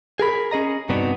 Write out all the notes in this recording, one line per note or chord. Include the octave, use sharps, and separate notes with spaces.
G#4 A#4 B5
C#4 G#4 D#5 A#5
G2 C3 B3 D4 D#4 F#4